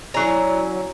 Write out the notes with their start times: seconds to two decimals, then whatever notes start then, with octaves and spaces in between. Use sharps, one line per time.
0.14 F#3 C#4 E4 D5 G#5 A#5